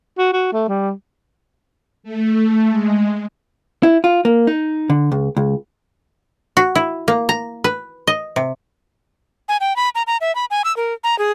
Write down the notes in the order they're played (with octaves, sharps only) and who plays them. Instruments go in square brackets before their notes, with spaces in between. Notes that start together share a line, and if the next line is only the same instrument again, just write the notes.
[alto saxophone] F#4
F#4
A3
G3
[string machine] A3
G#3
[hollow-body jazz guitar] E4
F4
A#3
D#4
D3
C#2
C#2
[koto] F#4
E4
A#3
A#5
B4
D#5
C3
[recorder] G#5
G5
B5
A#5
A#5
E5
B5
G#5
E6
A#4
A#5
G#4